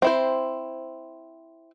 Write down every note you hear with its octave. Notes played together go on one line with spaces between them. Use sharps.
C4 E4 C5